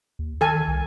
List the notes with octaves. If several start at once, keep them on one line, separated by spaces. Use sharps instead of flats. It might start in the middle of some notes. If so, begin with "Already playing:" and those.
D#2
D#3 A4 G#5
C2